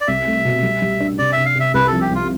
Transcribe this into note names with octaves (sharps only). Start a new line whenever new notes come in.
D5
C2 E5
A3
B2
G3
G3
D4
C3 D5
C3 E5
F5
C3 E5
C2 B4
F3 A4
G4
C2 F4